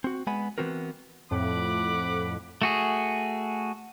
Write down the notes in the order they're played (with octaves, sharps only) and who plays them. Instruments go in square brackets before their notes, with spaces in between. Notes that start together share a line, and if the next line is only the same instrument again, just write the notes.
[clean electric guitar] C4 F#4
G#3 B3 F#5 G#5 B5
E3 F3 B3 C4 F#4 A#4
[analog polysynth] F2 A2 [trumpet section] F#5 B5 D6
[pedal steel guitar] A3 F#4 G#4